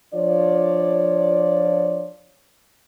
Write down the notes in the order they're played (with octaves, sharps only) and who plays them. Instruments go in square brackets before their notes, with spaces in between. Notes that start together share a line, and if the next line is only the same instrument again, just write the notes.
[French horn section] F3 D4 F4 C#5 D5